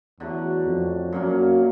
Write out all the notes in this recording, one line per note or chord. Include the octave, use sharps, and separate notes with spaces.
E2 D3 F#3 A3
F2
F#2 A#2 F#3 A#3 C#4